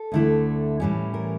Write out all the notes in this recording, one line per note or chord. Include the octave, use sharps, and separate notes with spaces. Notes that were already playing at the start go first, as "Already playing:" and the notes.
Already playing: A4
D2 D3 A3 E4
A2 E3 G3 C#4
A#4